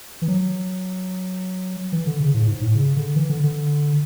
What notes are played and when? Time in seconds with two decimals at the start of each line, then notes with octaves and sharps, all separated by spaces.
0.22 E3
0.28 F#3
1.92 E3
2.06 D3
2.20 C#3
2.34 A2
2.48 G#2
2.62 A2
2.75 C#3
2.96 D3
3.16 E3
3.30 D3
3.44 D3